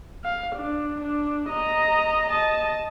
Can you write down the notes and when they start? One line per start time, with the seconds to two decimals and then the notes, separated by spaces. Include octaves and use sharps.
0.24 F5
0.56 D4
1.01 D4
1.49 D#5 A#5
2.30 D#5 A5